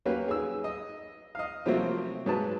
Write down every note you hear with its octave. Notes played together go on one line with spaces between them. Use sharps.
F#3 A#3 C#4 G4 B4
G#4 E6
D#5
D#5 F5
C3 F3 F#3 A3 A#3 C4
G#2 F#3 B4 A5